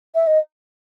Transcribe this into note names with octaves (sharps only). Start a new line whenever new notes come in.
E5
D#5